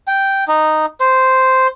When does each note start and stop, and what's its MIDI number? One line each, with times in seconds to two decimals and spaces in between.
0.07 0.44 79
0.48 0.86 63
1.00 1.67 72